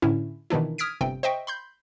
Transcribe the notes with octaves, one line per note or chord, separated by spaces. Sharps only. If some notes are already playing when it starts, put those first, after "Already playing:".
A2 D3 C#4 E4
B2 D#3 E3 D4 E4
D#6 F6 G#6 B6 D7
G1 C3 G5
C5 D#5 E5 G5 C#6
B5 C6 G6